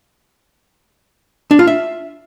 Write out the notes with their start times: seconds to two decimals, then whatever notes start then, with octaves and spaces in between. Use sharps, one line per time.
1.51 D4
1.59 F4
1.67 E5